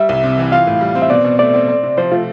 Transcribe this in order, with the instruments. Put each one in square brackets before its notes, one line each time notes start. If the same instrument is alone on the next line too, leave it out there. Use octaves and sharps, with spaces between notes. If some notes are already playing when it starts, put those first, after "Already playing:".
Already playing: [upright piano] G3 [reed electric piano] E5
[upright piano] C2
C3
E3
[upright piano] F4 [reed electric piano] F5
[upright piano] A2
G3
C4
[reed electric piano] E5
[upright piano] B2 [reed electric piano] D5
[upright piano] B2
[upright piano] A3 [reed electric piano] D5
[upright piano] C4
C4
C3
[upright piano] F3 [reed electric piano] C5
[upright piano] A3 [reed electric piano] F4